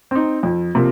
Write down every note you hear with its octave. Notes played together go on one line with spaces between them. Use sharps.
C4 D#4
F2
C3 F3 A#3